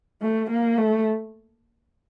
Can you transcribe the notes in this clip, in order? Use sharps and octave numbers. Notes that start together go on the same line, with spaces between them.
A3
A#3
A3